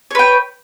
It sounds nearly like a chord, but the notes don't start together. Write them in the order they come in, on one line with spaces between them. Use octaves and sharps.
C#5 B4 G5